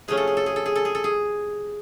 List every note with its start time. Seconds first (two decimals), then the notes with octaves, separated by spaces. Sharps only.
0.08 C3 F3 A3 C#4 G#4
0.17 A4
0.27 G#4
0.37 A4
0.46 G#4
0.56 A4
0.66 G#4
0.76 A4
0.85 G#4
0.95 A4
1.04 G#4